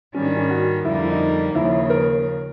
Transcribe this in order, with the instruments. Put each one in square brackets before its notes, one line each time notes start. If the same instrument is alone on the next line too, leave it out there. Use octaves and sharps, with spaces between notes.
[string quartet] G#2 D#3 G3 [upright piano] C#4
[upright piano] D4
C#4
F#4
[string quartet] F2 D3 G3 A#3 [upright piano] E4
[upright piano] E4
D#4
[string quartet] D#2 C#3 F3 [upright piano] E4
[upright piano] A#4